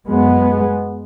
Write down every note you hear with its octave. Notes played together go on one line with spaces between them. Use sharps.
F#2 G#3 B3